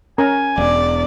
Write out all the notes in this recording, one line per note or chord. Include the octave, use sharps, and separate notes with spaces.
C#4 A#4 G#5 A#5
E1 D5